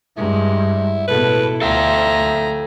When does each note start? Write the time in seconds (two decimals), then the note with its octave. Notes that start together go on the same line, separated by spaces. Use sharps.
0.17 G2 G#3 E4
1.08 A1 B2 E4 A4 B4
1.61 D2 A4 E5 F5 G5 A#5